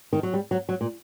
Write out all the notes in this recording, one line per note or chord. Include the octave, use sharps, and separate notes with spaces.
D#3
F#3
G3
F#3
F#3
A#2